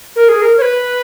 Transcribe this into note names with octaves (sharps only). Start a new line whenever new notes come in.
A#4
G#4
A#4
C#5
B4